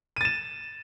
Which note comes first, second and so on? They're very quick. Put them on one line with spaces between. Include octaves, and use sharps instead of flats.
D#7 A6 E7